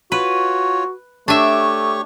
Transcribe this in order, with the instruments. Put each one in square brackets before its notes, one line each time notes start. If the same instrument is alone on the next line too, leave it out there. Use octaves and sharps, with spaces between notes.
[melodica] F4 C#5 [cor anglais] F#4 [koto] B4
[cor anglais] A3 [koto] D4 E5 [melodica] G4 C#5 C#6